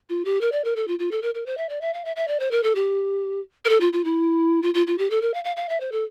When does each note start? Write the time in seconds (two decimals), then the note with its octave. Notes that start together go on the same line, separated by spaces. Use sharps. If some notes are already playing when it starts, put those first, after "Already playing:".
0.09 F4
0.25 G4
0.41 A#4
0.52 D5
0.64 A#4
0.76 A4
0.88 F4
0.99 F4
1.11 A4
1.22 A#4
1.35 A#4
1.46 C5
1.57 E5
1.69 D5
1.81 E5
1.94 F5
2.05 E5
2.16 E5
2.28 D5
2.40 C5
2.51 A#4
2.63 A4
2.75 G4
3.65 A#4
3.69 A4
3.80 F4
3.93 F4
4.04 E4
4.62 F4
4.74 F4
4.87 F4
4.98 G4
5.10 A4
5.22 A#4
5.34 F5
5.44 F5
5.56 F5
5.69 E5
5.80 C5
5.92 A4